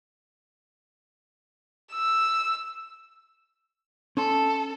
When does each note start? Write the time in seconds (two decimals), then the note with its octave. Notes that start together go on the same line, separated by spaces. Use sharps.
1.93 E6
4.17 C#4 A4 C6